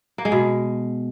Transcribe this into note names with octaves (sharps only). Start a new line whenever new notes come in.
A#3
G#3
B2